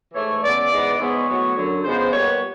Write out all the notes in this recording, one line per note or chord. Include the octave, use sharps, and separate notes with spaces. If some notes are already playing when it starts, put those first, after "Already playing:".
G#2 E3 A3 C#5
C#3 E3 G#3 B3 D5
G#2 E3 G#3 B3
G#2 E3 G#3 B3 C#5
A2 F#3 B3
F#2 D3 F#3
C#3 F3 G#3 B3 C5
A#2 G3 B3 C#5